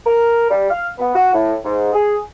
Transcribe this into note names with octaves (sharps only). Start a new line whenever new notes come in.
A#4
G3
F5
B3
F#4
A2
G#2
G#4